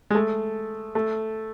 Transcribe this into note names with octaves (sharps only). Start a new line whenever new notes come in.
G#3
A3
A3